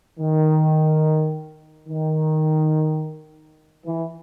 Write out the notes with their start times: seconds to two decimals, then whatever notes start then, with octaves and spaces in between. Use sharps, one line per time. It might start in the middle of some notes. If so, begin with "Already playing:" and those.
0.19 D#3
1.88 D#3
3.86 E3